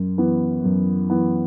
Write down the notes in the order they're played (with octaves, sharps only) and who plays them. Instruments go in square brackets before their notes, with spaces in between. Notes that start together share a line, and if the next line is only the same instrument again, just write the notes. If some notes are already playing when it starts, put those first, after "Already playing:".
Already playing: [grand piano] F#2
E3 B3
F#2
E3 B3